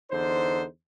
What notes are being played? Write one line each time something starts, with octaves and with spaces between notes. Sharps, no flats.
E2 D3 D#4 C5